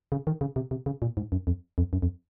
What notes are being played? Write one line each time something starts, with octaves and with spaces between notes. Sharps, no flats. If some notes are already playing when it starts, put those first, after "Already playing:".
C#3
D#3
C#3
C3
C3
C#3
A#2
G#2
F#2
F2
F2
F#2
F2